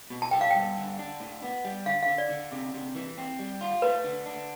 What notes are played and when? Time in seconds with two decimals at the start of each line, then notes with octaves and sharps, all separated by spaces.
0.10 B2
0.22 A5
0.31 A4 G5
0.41 F5
0.51 G2 G5
0.77 D3
0.99 D4
1.20 A2
1.42 B3
1.64 G3
1.86 D3 F5
2.03 F5
2.08 D3
2.18 D5
2.30 D3
2.52 C3
2.74 C3
2.95 E3
3.18 C4
3.39 G3
3.61 F4
3.82 A3 B4
4.04 D3
4.26 D4